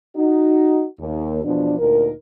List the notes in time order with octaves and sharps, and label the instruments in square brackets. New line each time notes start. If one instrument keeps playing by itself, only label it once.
[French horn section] D#4 F#4
D#2
E2 B2 F3 D4
D2 A#2 D#4 A#4